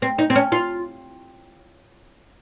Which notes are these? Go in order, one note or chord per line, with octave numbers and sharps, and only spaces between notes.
C4
D#4
C4
C#4
F4